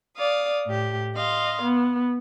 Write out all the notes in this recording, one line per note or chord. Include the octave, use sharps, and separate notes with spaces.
D5 F5 D#6
A2 G4
D#5 F5 C6
B3